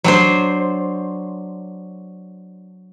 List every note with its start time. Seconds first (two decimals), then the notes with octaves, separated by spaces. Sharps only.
0.04 F#3 D4 C5